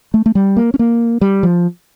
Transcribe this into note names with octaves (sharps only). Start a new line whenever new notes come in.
A3
A3
G3
A#3
C#4
A#3
G3
F3